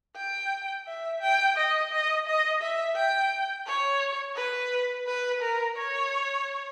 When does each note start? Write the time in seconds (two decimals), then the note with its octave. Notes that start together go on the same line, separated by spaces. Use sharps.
0.17 G5
0.87 E5
1.21 G5
1.57 D#5
1.92 D#5
2.27 D#5
2.62 E5
2.96 G5
3.67 C#5
4.36 B4
5.07 B4
5.42 A#4
5.77 C#5